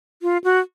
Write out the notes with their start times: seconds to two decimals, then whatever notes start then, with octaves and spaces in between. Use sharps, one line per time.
0.22 F4
0.44 F#4